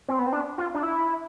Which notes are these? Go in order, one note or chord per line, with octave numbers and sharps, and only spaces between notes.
C4
B3
C4
D4
F4
D4
E4